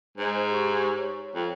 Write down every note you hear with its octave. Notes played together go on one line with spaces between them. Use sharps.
G#2 C5 D#5
G4 C#6
C#5
F2